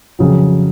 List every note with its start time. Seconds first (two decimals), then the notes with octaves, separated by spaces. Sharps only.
0.19 F2 C#3 F#3